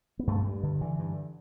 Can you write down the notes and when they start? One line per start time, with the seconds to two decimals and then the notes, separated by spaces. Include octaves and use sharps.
0.19 B3
0.27 G2 A3
0.45 G2
0.63 D3
0.81 D3 E3
0.99 G2